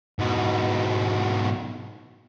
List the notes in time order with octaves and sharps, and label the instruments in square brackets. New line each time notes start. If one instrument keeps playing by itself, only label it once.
[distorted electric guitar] G#2 B2